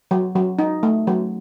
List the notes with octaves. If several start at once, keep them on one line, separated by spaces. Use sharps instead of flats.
F#3
F#3
D#4
A3
F#3